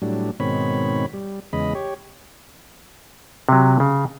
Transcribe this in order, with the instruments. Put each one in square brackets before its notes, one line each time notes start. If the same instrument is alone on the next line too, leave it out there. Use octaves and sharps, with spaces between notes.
[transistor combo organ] A2 F#3 G3 D4
G#2 B2 D#3 C4 C#5 B5
G3
E2 C#3 G#3 D#5 B5
G4 C#5
[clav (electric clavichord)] C3 F#3
C#3